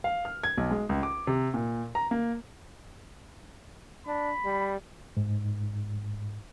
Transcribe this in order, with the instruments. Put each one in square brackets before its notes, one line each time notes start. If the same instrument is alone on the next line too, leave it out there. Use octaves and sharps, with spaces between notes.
[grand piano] F5
F6
G#6
B1
G#3
C#2
D6
C3
A#2
A#5
A#3
[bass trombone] D4 [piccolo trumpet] B5
[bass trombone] G3
[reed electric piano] G#2